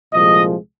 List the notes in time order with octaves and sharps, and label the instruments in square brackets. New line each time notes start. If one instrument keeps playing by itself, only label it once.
[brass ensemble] C2 A#2 F3 G#3 D#5